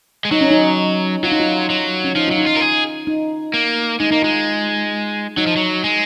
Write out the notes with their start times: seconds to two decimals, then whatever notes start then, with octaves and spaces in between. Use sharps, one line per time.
0.25 G#3
0.31 F#3 D#4
0.41 C#4
0.51 D#4
1.23 F#3 F4
1.32 D#4
1.40 F4
1.70 F#3
2.04 C#4
2.16 F3 D#4
2.28 F#3 F4
2.38 D#4
2.47 F4
2.57 A#4
2.62 G#4
3.07 D#4
3.54 A#3
4.00 G#3 D#4
4.11 A#3 D#4
4.22 G#3 F4
5.37 F#3 D#4
5.47 F3
5.56 F#3
5.84 G#3